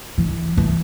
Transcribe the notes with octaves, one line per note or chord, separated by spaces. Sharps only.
E3
E3